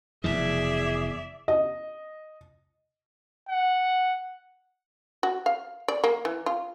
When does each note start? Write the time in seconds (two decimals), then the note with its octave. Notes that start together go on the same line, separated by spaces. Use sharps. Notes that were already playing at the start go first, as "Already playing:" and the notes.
0.24 F1 B2 E3 G#4 D5 E5
1.48 D#5
3.49 F#5
5.23 F#4
5.46 F5
5.88 D5
6.04 A#3
6.25 E3
6.46 F4